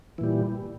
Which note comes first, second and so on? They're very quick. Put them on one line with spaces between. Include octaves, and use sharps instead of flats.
E3 A#2 G3